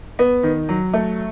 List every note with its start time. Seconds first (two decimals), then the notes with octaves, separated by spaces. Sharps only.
0.19 B3
0.43 D#3
0.69 F#3
0.93 A3